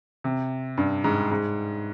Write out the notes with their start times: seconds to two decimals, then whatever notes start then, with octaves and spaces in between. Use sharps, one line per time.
0.24 C3
0.78 G2
1.04 G#2
1.31 G#2